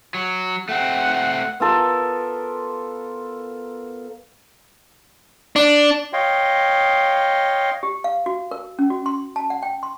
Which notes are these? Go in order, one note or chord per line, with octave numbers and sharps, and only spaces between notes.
F#3
A3 C4 F#5
B3 F4 A4 A#4
D4
C#5 D#5 F5 G5 C6
G4
F5
F#4
A#4
C#4
F#4
C6
A5
F#5
G5
C6